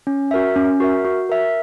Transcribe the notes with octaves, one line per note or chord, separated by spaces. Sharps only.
C#4
F#4 A#4 E5
C#4
F#4 A#4 E5
F#4
A#4 E5